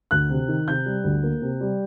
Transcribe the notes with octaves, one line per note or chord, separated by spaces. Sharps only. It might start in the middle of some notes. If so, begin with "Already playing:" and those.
D2 F#6
C3
D#3
C3 G6
G3
D2
A#3
C3
G3